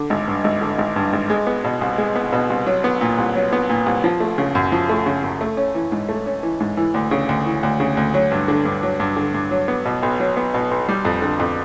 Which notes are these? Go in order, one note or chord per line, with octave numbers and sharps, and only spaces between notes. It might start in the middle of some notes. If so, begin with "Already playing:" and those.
Already playing: D3
G#1
G2
G#1
D3
G#1
G2
G#1
G#3
B3
B2
C2
G#3
B3
B2
C2
F#3
B3
A#2
C2
F#3
B3
A#2
C2
F3
A3
C#3
F#2
F3
A3
C#3
F#2
A3
C#4
E3
G#2
A3
C#4
E3
G#2
E3
D2
C#3
D2
E3
D2
C#3
D2
F#3
G2
D3
G2
F#3
G2
D3
G2
F#3
B3
B2
B1
F#3
B3
B2
B1
G3
F2
D3
F2